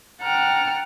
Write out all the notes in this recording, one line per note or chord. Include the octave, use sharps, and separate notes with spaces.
F#5 G5 A5 A#5 F6